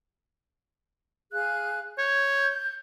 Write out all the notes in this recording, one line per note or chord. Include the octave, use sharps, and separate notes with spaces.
G#4 F5 F#6
C#5 G6